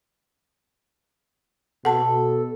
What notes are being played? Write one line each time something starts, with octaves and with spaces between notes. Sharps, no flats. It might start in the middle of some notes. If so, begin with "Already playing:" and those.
B2 A4 F#5 A5